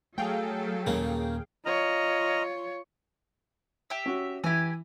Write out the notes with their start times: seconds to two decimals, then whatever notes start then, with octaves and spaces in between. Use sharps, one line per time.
0.18 F#3 A3 G#4 A4 F5 G5
0.87 D#2 A#2 C#3 A#3
1.65 F4 C#5 D#5 A#5 F6
3.90 G4 E5
4.06 C#4 F#4
4.44 E3 E4 G4 G#5